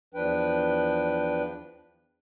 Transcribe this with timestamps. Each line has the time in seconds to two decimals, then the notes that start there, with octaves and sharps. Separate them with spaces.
0.14 E2 F3 D4 B4 G5